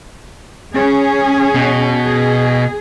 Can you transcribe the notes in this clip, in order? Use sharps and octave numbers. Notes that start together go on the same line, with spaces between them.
C#4 G#4
B2
G#4